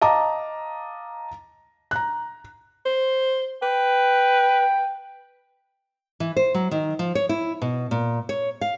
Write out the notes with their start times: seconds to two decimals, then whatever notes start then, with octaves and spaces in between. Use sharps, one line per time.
0.01 D#5 F5 A5 A#5 D6
1.91 A#5 F#6
2.85 C5
3.62 B4 G5
6.20 E3
6.37 C5
6.54 F#3
6.71 D#3
6.99 F3
7.15 C#5
7.29 E4
7.62 B2
7.91 A#2
8.29 C#5
8.61 F5